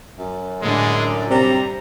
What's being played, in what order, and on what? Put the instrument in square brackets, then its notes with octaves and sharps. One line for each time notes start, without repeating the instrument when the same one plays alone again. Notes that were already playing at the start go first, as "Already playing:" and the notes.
[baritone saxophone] F#2
[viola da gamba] A2 D3 D4 [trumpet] G#3
[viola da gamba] C3 [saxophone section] G3 C4 [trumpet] A#5